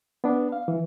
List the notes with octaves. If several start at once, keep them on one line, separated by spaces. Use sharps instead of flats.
B3 D4
F5
E3